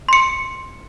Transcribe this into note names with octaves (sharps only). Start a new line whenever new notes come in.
C6 C#7